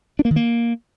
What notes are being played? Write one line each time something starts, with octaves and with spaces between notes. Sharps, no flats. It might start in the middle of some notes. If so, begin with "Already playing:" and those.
D4
A#3
D#3
A#3